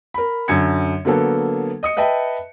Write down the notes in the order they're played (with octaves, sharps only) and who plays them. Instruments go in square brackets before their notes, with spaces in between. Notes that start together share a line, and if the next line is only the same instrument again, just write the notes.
[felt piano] A#4 B5
F#2 D3 G#6 C#7
D3 F#3 A#3 B3 A4
D#5 D#6 C#7
B4 D#5 E5 G5 A5